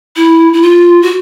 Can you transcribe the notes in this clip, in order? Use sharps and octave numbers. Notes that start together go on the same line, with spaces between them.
E4
E4
F4
F#4